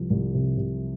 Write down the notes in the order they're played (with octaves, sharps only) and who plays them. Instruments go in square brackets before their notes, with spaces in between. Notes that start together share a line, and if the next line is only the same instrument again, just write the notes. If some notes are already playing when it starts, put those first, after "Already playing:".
Already playing: [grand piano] C2 F3
C2
C3
C3